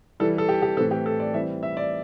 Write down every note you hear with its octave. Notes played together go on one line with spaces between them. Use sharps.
E3 G3 E4 A4
A4
G4
G4
A2 E3 C4 E4 A4
G4
A4
D5
E3 G3 C4 E5
E5
D5